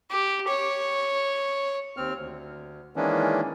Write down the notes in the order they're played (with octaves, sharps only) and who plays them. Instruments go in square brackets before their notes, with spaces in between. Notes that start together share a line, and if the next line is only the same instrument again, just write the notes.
[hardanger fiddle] G4
C#5
[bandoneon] D#2 C4 F6
D2
D#3 E3 G#3 A#3 C#4 D4